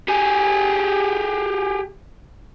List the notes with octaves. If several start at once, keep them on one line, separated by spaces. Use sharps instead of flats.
G4 G#4